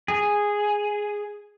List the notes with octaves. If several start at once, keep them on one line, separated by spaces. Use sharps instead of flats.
G#4